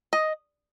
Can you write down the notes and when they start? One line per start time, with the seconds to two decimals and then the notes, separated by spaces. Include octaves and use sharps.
0.13 D#5